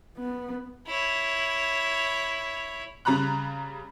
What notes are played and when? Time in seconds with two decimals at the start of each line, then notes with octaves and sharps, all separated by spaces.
0.18 B3
0.87 E4 C#5
3.05 C#3 G3 A#5 B5 F#6